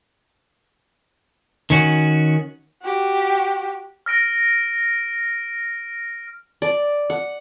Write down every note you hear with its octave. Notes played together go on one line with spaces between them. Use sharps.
D#3 C#4 F#4
F#4 G4
F6 A#6 D7
D5
F#5